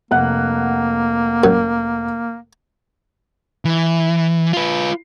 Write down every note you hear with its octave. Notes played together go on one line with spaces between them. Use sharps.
F1 A#3 F#5 F#6
F#2
E3
F4 B4